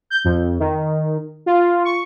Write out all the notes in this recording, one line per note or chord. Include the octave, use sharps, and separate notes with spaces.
G6
F2
D#3
F4
C#6